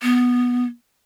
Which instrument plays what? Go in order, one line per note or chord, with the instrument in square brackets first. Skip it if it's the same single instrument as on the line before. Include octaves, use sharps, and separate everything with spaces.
[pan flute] B3